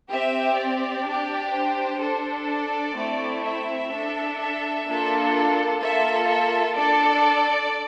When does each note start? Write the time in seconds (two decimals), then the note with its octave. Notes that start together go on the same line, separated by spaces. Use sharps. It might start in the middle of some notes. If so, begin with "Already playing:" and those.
0.10 C4 G4 E5
0.57 D5
1.05 D4 G4
1.53 C5
2.01 D4 A4
2.47 D5
2.96 A3 C4 E4
3.43 E5
3.91 D4 A4
4.39 E5
4.86 A#3 D4 F4 A4
5.81 A#3 F4 A4 E5
6.29 E5
6.76 D4 A4 D5